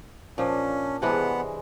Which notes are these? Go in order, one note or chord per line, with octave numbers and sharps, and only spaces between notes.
A#2 F3 C#4 D4
C3 E3 G#3 B3 D4 F#5